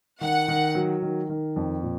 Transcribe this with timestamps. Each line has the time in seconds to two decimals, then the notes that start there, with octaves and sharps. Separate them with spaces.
0.21 D#3 F#5
0.48 D#3
0.75 F#3
1.02 D#3
1.29 D#3
1.56 F2
1.83 A#2